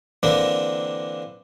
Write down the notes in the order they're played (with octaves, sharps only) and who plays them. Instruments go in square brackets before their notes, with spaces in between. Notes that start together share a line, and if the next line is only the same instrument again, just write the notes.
[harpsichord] D3 E3 A#3 C4 D4 A#4